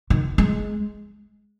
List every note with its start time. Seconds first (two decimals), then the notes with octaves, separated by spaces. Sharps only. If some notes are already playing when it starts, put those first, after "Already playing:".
0.10 D#3
0.38 G#3